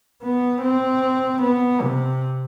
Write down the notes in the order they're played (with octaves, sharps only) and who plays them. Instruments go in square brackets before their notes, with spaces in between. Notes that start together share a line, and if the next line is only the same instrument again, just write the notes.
[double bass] B3
C4
B3
C3